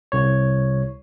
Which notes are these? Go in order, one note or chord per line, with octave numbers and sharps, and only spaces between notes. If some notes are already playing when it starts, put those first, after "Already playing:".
C2 C#5